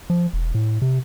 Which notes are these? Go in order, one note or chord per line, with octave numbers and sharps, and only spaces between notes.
F3
E1
A2
C3